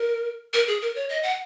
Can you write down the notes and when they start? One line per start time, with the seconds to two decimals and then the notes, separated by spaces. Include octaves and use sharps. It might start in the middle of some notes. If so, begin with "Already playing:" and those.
Already playing: A#4
0.54 A#4
0.67 G#4
0.82 A#4
0.95 C#5
1.09 D#5
1.23 F#5